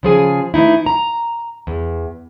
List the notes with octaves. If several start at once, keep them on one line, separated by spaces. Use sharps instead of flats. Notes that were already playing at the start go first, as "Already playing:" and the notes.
C#3 F3 G#4 G#5
E3 A3 D#4 E4
A#5
E2